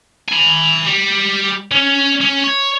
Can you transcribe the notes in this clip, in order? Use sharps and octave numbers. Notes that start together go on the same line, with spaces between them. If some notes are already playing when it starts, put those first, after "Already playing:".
G#5 B5
G3
C#4
C#4
C#5